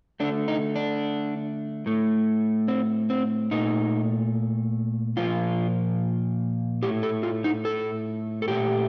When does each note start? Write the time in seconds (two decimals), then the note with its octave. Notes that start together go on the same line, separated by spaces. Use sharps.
0.20 D3 A3 D4
0.48 D#4
0.76 D4
1.86 A2 A3
2.68 C4
3.10 C4
3.51 A#2 A3 D#4
5.17 A#2 F3 A#3 F4
6.83 A2 A3 G4
7.03 A4
7.23 F4
7.44 D#4
7.65 A4
8.42 A4
8.48 A#2 A3 G4